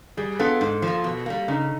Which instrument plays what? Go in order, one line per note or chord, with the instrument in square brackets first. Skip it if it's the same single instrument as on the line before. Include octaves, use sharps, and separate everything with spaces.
[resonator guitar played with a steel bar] G3 [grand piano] G#4
[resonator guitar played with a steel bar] B3 D4 F4 [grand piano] A4
[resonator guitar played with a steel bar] G#2
F3
A#3
B2
G3 A#3
[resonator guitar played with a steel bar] C#3 [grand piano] D#4